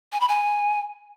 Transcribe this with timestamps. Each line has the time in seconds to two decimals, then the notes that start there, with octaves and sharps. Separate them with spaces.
0.12 G#5
0.21 B5
0.29 G#5